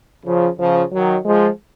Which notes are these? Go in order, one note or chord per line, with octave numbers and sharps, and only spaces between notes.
C#3 F3
C#3 F3
D#3 F#3
F3 G#3